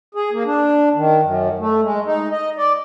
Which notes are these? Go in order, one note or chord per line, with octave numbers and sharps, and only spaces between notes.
G#4
A#3
D4
D#3
F#2
A3
G#3
D#4
D#5
D5